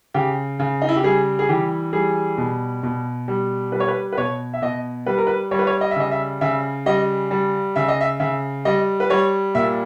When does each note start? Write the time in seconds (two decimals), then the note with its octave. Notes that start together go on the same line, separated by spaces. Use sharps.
0.14 C#3 G4
0.59 C#3
0.82 D#4
0.89 E4
0.96 G4
1.04 G3 G#4
1.39 G#4
1.49 E3 G4
1.93 G3 G#4
2.38 B2
2.83 B2
3.28 G3
3.72 G3 B4
3.80 C#5
3.88 B4
4.13 B4
4.17 B2 C#5
4.54 E5
4.62 B2 D#5
5.06 G3 B4
5.18 A#4
5.27 B4
5.51 G3 C#5
5.59 B4
5.67 C#5
5.81 D#5
5.91 E5
5.96 C#3 D#5
6.11 E5
6.41 C#3 E5
6.86 G3 D#5
7.31 G3
7.76 C#3 E5
7.88 D#5
8.01 E5
8.20 C#3 E5
8.65 G3 D#5
9.00 B4
9.10 G3 C#5
9.55 A#2 E5